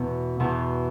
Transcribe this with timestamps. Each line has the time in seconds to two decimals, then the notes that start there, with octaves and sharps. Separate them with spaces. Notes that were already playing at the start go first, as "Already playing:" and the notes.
Already playing: E2 B2 B3
0.40 E2 B2 B3